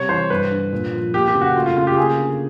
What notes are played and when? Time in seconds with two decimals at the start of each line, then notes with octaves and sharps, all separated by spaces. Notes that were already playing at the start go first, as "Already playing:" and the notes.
Already playing: C3 G3 C#5
0.09 E3 C5
0.30 G2 B4
0.52 D3
0.72 A#2
0.93 F3
1.14 A#3 G4
1.28 G4
1.34 C#3
1.41 F#4
1.56 A3 F4
1.66 F4
1.77 C#3 F4
1.87 G4
1.97 A#3 G#4
2.18 D3